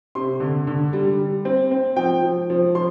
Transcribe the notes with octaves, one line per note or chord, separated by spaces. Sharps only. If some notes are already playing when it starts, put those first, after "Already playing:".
C3 C6
D3
D3
G3
G3
C4
C4
F3 G5
F3
F3
F3 C6